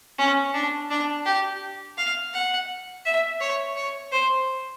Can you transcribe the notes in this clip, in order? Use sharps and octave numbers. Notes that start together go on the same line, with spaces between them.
C#4
D4
D4
G4
F5
F#5
E5
C#5
C#5
C5